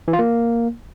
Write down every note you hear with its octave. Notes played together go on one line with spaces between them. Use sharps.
E3
F4
A#3